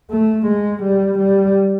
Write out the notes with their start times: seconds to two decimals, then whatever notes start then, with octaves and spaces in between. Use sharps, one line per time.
0.10 A3
0.47 G#3
0.83 G3
1.19 G3